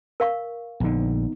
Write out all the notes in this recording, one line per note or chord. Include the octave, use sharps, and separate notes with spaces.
A#4 F5 C#6
A#1 D3 B3 D#4